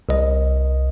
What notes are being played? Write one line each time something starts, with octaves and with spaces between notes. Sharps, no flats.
C2 D#5